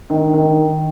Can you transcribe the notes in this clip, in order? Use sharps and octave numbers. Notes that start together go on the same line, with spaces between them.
D#3
D#3